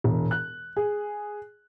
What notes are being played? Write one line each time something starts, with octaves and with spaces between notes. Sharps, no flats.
E1
F#6
G#4